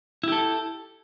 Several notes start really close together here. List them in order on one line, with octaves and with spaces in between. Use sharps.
E4 G4 A4